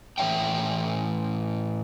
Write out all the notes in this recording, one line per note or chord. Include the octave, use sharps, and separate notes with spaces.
A2 E3 G#3 C#5 E5 G5